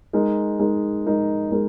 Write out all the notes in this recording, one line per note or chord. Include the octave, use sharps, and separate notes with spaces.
G#3 D#4 A#4
G#3 D#4 A#4
G#3 D#4 A#4
G#3 D#4 A#4